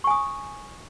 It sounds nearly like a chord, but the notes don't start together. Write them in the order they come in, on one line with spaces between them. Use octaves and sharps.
C#6 G#5 D#6